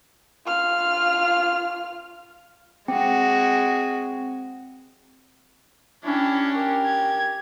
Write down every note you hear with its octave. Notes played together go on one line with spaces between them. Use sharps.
F4 F6
G#3 C4 F#4
C#4 D4 E4 G4
G4 A#4
G#6